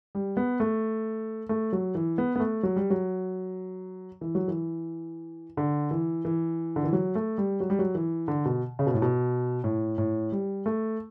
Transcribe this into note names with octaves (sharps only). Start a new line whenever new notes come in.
G3
B3
A3
A3
F#3
E3
B3
B3
A3
F#3
G3
F#3
E3
F#3
E3
D3
E3
E3
D3
E3
F#3
A3
G3
F#3
G3
F#3
E3
D3
B2
C#3
B2
A2
B2
A2
A2
G3
A3